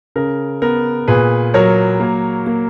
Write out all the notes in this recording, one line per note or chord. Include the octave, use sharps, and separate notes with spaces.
C#3 A#4
B3 A#4
A#2 G#4 B4
F#3 A#4 C#5
A#3
A#3